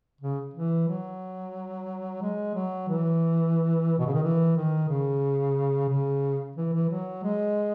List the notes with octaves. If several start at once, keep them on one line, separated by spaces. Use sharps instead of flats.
C#3
E3
F#3
G#3
F#3
E3
B2
C#3
D#3
E3
D#3
C#3
C#3
E3
E3
F#3
G#3